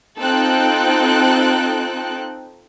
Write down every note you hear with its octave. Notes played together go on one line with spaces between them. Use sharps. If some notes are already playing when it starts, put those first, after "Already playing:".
C4 D#4 F4 A4 G5 F#6